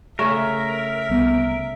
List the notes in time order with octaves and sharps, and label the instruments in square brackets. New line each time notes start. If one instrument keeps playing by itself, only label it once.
[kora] C#3 A3 [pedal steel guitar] A#4 [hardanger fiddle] E5
[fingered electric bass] C2 B3